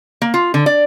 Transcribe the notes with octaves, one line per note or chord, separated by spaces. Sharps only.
A#3
F4
D3
D5